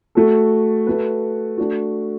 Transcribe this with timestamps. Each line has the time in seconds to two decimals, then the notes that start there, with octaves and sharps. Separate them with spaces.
0.15 A3 F#4 A4
0.87 A3 F#4 B4
1.58 A3 D4 F#4